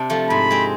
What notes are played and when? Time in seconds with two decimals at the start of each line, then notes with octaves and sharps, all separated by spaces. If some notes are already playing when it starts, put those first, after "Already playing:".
Already playing: C3 D4
0.10 F3 A3
0.30 G#2 B5
0.51 G#3 C4